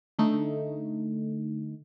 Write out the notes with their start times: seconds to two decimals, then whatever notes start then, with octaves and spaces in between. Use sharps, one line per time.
0.19 D3 A3 D#4